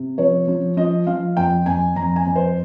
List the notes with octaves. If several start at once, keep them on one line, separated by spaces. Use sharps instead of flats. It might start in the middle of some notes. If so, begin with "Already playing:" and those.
Already playing: C3
F3 C#5
F3
F3 D#5
F3 F5
F2 G5
F2 G#5
F2 A#5
G#5
F2
C5